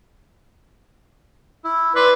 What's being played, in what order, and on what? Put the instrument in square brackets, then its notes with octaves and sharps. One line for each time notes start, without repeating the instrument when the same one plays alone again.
[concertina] E4
[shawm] B4 [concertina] D5 C6